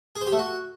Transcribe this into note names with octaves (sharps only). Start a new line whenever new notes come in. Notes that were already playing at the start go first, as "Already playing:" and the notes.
G#4
C5
G4
A3
F#4